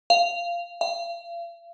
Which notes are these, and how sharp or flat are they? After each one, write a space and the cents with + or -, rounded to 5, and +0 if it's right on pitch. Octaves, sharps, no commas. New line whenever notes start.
F5 -15
F5 -35